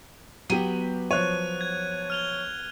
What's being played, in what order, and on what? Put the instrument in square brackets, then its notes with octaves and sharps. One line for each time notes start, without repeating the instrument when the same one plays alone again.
[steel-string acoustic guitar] F#3 B3 [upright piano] G4 D#7
[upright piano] F3 C#5 [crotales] F#6 D#7
[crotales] G#6
F6 F7 G7